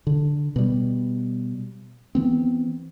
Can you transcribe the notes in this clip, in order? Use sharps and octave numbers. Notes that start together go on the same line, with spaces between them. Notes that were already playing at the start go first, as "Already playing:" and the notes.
D3
B2 G3
E3 B3 C4